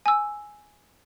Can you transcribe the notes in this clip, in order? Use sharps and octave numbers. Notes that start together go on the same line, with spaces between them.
G#5 E6